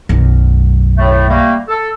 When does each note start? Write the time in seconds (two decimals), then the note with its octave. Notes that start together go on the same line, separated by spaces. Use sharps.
0.09 B1 F#2
0.97 A2 A3
1.29 G3 A3 A#3
1.68 A4